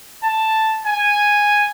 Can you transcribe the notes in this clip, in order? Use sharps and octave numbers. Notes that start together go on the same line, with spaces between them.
A5
G#5